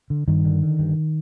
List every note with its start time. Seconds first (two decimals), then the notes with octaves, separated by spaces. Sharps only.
0.10 D3
0.28 G2 D#3
0.45 D3
0.63 D3
0.79 G2